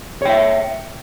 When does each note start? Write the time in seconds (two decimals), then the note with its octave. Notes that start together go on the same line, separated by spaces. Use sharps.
0.22 C#5
0.25 G5
0.29 E5